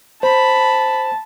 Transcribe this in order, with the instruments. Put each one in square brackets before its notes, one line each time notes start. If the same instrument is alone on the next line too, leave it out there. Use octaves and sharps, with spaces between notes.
[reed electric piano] C5 [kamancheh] A5 [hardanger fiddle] B5